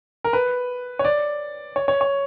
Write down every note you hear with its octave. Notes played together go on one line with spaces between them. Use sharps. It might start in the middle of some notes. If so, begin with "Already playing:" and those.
A#4
B4
C#5
D5
C#5
C#5
C#5